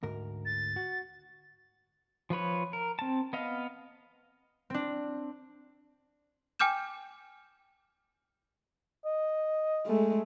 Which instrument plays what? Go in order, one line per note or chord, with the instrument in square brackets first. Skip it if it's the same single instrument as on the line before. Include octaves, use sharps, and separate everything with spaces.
[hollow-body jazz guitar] D2 G#2 A#4
[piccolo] A6
[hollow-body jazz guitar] F#4
[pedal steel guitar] F3 F4 B4 C#5
A#4
C4 A5
B3 D#5 F5
[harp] C4 D4
[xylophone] G5 G#5 D6 F6 G6 E7
[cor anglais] D#5
[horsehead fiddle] G#3 A3